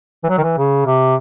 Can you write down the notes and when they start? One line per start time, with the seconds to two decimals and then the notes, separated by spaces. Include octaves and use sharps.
0.24 E3
0.29 F#3
0.38 D#3
0.43 E3
0.58 C#3
0.85 C3